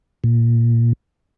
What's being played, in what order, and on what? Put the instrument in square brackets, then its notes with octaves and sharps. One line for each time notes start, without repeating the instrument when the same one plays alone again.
[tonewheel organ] A#2